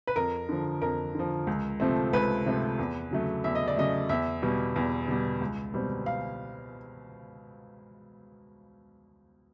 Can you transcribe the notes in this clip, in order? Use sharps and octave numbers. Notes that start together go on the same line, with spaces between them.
B4
F2 A#4
D3 F3
F2 A#4
D3 F3
C#2
C3 F3 A3 C4
C#2 B4
C3 F3 A3 C4
E2
C#3 F#3 A3
E2 E5
D#5
D5
C#3 F#3 A3 D#5
E2 E5
B2 G3
E2
B2 G3
C#2
B2 G3 C4
F5